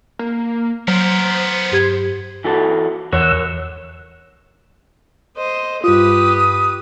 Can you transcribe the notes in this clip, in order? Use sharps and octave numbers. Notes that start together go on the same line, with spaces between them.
A#3
F#3 B3 A#4 C5
G2 G4 G#6
E3 F#4 A4
E2 A#4 C#5 F#5 E6
C5 D#5
G2 F4 G4 B4 D#6